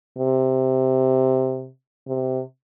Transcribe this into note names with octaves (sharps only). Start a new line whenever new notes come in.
C3
C3